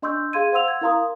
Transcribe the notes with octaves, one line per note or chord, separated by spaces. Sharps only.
D4 D#5 C6 C#6 E6 G6
G#4 F5 C6 G#6 D#7
C5 F5 F#5 C6 E6 F7
G#6
E4 A#4 F5 A#5 C6 D#6